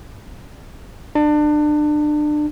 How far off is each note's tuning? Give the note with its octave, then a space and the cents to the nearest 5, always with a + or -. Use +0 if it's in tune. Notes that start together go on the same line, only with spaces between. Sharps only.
D4 +30